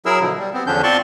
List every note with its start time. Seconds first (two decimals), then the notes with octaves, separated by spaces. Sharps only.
0.06 F#3 E4 G#4 A#4 E6
0.21 B2 D3 F3
0.38 G3
0.54 B3 C4
0.67 E2 D3 F3 C#4 D4 G6
0.83 C4 F4 D5 A5 C6 C#6